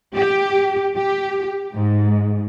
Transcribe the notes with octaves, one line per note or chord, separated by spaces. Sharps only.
G4
G4
G#2